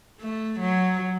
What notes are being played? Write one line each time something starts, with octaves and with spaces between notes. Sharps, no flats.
A3
F#3